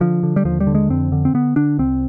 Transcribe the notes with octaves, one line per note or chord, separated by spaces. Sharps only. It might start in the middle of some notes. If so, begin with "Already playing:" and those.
D3 F3
D3
G3
D#2 F3
G3
D3
G#3
F2 C4
D3
C4
D3 B3
D3 D4
C2 C4